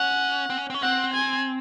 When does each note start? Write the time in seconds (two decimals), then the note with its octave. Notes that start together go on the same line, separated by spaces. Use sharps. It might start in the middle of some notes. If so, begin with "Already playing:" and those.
Already playing: C#4 F#5
0.50 C4
0.58 C#4
0.70 C4
0.74 C#4
0.82 C4 F#5
1.14 G#5